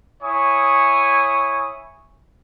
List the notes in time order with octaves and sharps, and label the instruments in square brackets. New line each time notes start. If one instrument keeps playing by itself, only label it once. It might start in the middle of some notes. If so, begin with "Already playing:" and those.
[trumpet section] E4 C#5 G#5 C#6 D#6